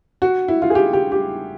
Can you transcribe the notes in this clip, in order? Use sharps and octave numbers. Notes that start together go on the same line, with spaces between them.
F#4
E4
F4
G#4
G4
G4
G4